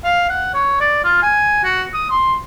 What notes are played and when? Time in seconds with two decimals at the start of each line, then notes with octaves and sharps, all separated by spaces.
0.04 F5
0.30 F#5
0.54 C#5
0.80 D5
1.04 F4
1.23 G#5
1.64 F#4
1.94 D#6
2.10 C6